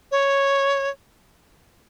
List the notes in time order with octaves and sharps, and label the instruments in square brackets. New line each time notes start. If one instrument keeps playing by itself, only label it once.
[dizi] C#5